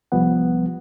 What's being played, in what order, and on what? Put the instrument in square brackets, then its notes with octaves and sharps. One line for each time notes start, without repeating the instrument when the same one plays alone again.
[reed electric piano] C2 F3 G3 B3 F#5